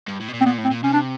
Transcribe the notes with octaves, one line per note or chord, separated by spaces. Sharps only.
G2
A2
B2
A#2
C4
A#2 B3
A2
C4
A#2
C3 C#4
D4